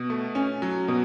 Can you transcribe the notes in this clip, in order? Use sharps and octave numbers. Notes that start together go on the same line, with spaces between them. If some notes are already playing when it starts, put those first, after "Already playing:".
Already playing: B2
A3
C#4
F#3
B2